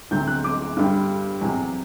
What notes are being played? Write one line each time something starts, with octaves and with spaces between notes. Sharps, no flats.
D2 C3 F#3 G6
F#6
D6
G2 D3 G3
E2 C3 F#3